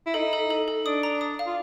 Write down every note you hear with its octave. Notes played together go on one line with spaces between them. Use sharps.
E4
D#4 A4
A4
A4
A4
D4 D#6
A#5
D#6
F5
F4